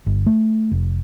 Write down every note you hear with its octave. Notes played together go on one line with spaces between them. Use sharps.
G1
A3
F1